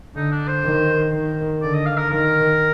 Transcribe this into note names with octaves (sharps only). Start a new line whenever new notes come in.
D3 D#4
D4
C5
D#3
D#3
D3 D5
D#5
F5
A#4
D#3 A#4